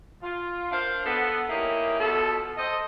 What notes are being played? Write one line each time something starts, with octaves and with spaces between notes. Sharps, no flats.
F4
D4 A#4 C5 F5
B3 A4
A#3 C#4 D#4 E4 G4
B2 F4 A4
A4 C5 D#5